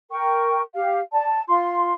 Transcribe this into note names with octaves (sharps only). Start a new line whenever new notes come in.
A#4 G5 C#6
G4 F5
D5 A5
F4 C6